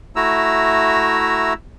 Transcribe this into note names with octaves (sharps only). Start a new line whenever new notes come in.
A3 E4 F#4 A#5 E6